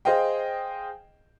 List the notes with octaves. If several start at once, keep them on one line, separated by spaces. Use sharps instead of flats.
G#4 C5 D#5 F5 G5